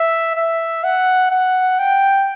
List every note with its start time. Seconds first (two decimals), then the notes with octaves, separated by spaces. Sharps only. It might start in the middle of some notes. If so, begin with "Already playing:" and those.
Already playing: E5
0.35 E5
0.83 F#5
1.31 F#5
1.79 G5